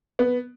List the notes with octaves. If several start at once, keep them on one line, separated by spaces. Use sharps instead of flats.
B3